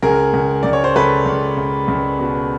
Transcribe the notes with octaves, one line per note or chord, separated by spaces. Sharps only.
C#2 G#4 A#4
C#2
C#2 D5
C#5
C5
C#2 A4 B4
C#2
C#2
C#2
B2